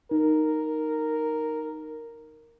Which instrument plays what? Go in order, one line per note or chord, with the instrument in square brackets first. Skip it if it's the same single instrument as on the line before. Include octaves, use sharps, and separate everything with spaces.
[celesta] D#4 [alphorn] A#4